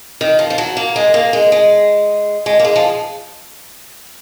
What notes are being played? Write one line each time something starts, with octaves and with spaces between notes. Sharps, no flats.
D#3
F3
F3
F#3
A#3
G#3
A#3
G#3
G#3
G#3
A#3
G#3
F3